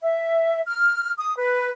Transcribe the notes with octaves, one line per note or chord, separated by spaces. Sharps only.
E5
F6
D#6
B4